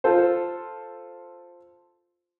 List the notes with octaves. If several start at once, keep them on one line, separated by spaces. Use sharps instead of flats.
F4 A4 C5